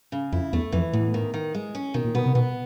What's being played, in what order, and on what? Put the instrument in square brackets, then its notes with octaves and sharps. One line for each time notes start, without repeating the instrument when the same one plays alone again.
[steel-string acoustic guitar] C#3
[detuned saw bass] F2 [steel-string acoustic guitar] E4
[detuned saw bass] E2 [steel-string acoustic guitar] A3
[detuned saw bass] F2 [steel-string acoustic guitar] E3
[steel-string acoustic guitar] E2 [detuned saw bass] A2
[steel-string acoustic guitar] D#3
D#3
G#3
C#4
[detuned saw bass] B2 [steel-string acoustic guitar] D#3
[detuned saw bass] A#2
[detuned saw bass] B2 [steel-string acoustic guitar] B3
[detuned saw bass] C3
[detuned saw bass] B2 [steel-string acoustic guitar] B3